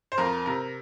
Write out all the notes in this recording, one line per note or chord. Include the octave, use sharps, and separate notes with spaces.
C5
F2 A#4
C3 A#4